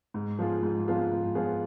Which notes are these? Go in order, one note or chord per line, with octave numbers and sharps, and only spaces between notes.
G#2
F3 B3 F4 G#4
G#2
F3 B3 F4 G#4
G#2
F3 B3 F4 G#4